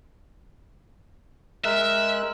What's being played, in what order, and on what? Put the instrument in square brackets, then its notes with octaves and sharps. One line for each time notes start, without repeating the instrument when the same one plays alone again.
[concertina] G#3 A#4 F#6 [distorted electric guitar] E5